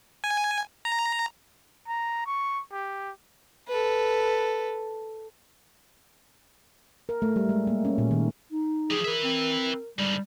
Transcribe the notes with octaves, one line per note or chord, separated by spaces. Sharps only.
G#5
A#5
A#5
C#6
G4
A4 B4
A#4
A3
G3
G#3
A#3
C#4
A#2
D#3
D#4
F3 G4 G#4
A#4 B4 E5
C4
G#2 D3 G3